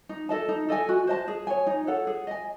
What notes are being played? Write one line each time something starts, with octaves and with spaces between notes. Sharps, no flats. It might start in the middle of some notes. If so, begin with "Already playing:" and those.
D#4
A4 D#5 A5
D#4
A4 D#5 G#5
F#4
C5 D#5 A5
G#4
C#5 G#5
D#4
A4 C#5 F#5
G#4
D#5 G#5